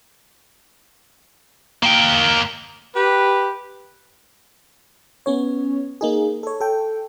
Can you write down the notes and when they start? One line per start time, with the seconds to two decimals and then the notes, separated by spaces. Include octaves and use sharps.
1.83 A#3 G5
2.95 G4 B4
5.26 B3 C#4 C#5
6.01 A#3 D#4 G#4
6.43 A4 C#5
6.60 A4 G5